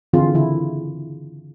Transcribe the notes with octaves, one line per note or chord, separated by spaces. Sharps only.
D3 E3 C4 F4 G#4
C#3 E3 E4